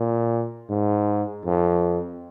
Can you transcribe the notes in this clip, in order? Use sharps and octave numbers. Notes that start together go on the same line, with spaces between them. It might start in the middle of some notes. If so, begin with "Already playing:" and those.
Already playing: A#2
G#2
F2